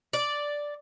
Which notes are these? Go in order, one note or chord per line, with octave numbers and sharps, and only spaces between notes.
D5